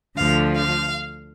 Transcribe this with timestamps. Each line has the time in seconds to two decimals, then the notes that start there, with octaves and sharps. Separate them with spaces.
0.16 D2 D3 F3 F5
0.56 F5